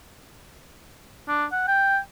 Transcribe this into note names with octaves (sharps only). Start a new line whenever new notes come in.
D4
F#5
G5